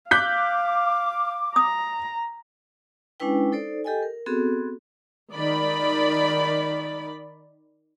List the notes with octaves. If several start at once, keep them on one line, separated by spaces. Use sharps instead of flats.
F5 D6 F#6 G6 B6
A#5 D#6
G#3 C#4 D4 E4 B4 G5
D#4 A4 C5 D5
G4 A4 D#5 G5 G#5
A#4
B3 C4 F#4 G#4 A4
D#3 D5 B5